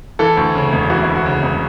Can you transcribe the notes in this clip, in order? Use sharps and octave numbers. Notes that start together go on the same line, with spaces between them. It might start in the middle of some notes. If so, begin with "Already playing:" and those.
E3 A4
D2
C#3
E1
E3 F#4
E4
D2
F#4
C#3
E1